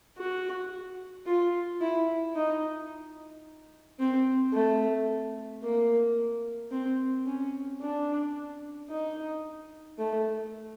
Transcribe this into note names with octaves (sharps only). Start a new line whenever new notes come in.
F#4
F4
E4
D#4
C4
A3
A#3
C4
C#4
D4
D#4
A3